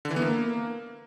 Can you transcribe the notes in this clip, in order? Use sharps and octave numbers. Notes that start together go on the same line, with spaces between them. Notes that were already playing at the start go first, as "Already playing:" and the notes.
D3
E3
B3
A#3